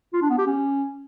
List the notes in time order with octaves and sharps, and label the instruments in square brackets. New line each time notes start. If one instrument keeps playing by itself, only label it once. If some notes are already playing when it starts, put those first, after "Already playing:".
[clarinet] F4
D4
B3
G4
C#4